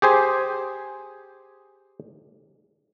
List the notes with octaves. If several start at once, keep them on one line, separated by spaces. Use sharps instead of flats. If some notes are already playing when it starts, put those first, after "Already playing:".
G4 G#4 C5 G#5